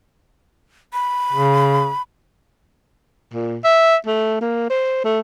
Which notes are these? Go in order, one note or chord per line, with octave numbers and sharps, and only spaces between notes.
B5
C#3
A#2
E5
A3
A#3
C5
A3